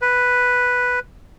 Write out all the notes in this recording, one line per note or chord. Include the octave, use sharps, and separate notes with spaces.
B4